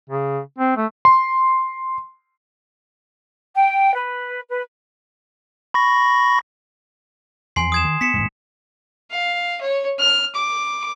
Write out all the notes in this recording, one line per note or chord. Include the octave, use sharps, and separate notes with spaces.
C#3
C4
A3
C6
G5
B4
B4
B5 C#6 A#6
E2 F3 G#5 C6 C7
D#6 G#6 E7
D#3
B3 B6 C#7 E7
D#1 C2 G#2
F5
C#5
F6
D6